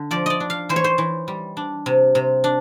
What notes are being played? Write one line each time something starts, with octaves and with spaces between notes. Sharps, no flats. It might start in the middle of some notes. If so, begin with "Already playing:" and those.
Already playing: D3
F3 D5
D5 D#5
D4
F5
E3 C5
C#5
C5
E3
G3
D4
C3
C3
D4